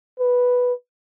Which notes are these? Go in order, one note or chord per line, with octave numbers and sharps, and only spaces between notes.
B4